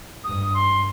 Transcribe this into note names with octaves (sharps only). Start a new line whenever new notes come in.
G2 D#6
C6